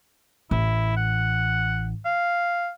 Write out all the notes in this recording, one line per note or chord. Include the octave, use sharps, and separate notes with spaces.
A1 E4
F#5
F5